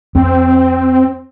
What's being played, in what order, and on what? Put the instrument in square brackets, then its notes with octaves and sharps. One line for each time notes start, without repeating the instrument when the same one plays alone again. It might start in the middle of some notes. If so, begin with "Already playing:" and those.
[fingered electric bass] F2 [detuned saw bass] C4